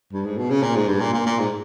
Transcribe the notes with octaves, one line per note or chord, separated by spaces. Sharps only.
G2
G#2
B2
C#3
A#2
G#2
G2
A#2
A#2
A#2
G#2